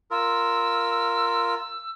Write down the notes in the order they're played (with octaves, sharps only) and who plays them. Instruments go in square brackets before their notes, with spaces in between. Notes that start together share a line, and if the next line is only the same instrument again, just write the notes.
[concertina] F4 A#4 [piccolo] E6